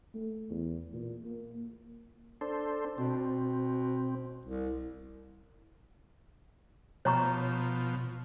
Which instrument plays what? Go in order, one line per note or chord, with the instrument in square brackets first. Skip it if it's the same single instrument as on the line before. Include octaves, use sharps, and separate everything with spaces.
[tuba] A3
E2
A#2
A#3
[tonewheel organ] D4 A4 C5
[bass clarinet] B2 [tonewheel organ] C4
[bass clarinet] C2
[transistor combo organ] B2 F3 [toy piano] C#5 A#5 C#6